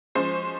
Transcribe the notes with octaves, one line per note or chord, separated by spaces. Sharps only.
F3 G#3 C#4 C5